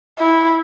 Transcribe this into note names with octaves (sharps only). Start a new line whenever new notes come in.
E4